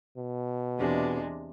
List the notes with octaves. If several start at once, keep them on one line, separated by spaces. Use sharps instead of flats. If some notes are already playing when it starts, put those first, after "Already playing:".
B2
E2 C3 G#3 D4